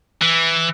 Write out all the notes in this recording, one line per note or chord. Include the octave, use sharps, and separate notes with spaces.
E3